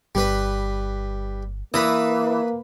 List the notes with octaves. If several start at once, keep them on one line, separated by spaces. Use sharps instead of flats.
G1 G3 B4
E3 A#3 B4 D#6